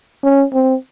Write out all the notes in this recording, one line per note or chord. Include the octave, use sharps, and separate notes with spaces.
C#4
C4